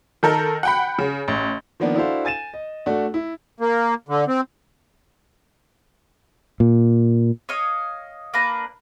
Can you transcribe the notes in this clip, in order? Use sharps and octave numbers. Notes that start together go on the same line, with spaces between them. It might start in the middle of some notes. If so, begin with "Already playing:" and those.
D#3 A4 A#4
F#5 G5 B5
C#3
A1
D#3 F3 A#3 B3 D4
D4 E4 F#4 A4 C5 F5
G#5 A6 D#7 E7
D#5
A3 D4 F#4
E4
A#3
D3
C4
A#2
C#5 D#5 F5 D#6
A#3 D4 B4 A#5